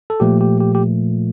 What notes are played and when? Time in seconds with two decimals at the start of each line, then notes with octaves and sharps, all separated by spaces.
0.10 A4
0.20 A#2 F3 A3 G4
0.41 G4
0.60 G4
0.75 G4